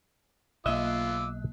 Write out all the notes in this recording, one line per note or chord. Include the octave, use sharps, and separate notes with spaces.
B1 A#3 F4 D#5 E5 D6 E6 F#6